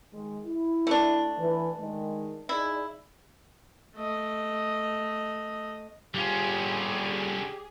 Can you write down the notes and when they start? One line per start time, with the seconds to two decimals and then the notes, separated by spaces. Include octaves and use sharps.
0.12 D#3 G#3
0.45 E4
0.87 A3 D4
1.37 E3
1.79 D#3 G#3
2.49 D#4 E4 G#4 D5
3.96 A3 D#5
6.14 D3 G3 C#4 F4 G4 G#4